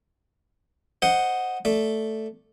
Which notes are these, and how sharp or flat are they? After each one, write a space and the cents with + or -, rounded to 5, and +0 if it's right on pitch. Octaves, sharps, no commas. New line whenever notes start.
C5 +0 D#5 +0 F#5 +0
A3 +0 D5 +0